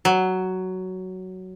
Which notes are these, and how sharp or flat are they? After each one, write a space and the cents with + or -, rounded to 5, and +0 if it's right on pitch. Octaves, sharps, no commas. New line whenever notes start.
F#3 +10